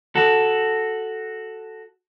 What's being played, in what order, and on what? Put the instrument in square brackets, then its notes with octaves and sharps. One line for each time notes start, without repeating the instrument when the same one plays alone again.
[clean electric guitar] F#4 A4